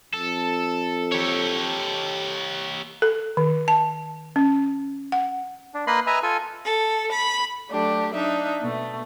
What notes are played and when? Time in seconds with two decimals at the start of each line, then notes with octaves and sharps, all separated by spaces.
0.14 F2 A4
1.12 G4 C#5
3.02 A4
3.37 D#3
3.68 A5
4.36 C#4
5.12 F#5
5.74 D4
5.87 A#3 B4 D#5 B5 C6
6.07 B4 D#5 E5 G#5 A#5
6.23 F4 A4 G#5
6.64 A4
7.11 B5
7.70 F#3 A3 D4 G4
8.14 D4 D#4 E5
8.61 B2 A3